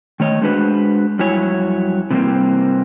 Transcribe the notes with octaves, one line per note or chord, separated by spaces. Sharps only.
D#3 A3 C#5 D#5
G#3 A3 D4 F#4 B4 C5
F2 F#3 G3 E4 C#5 G#5
C3 E3 G3 A3 A#3 C4